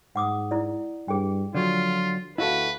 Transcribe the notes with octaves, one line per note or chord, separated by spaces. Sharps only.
G#2 F#5 D6 D#6
E4 D5
G2 G#4 G5
D3 F3 F#3 F4
D2 E4 F#4 A4 B4 D#5 F5